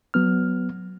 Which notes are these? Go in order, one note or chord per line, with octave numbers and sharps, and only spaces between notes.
F#3 B3 F6